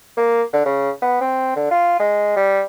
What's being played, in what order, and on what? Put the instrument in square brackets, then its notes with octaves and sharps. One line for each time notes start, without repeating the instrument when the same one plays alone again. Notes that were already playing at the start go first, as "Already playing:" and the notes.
[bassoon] A#3
D3
C#3
B3
C4
D3
F4
G#3
G3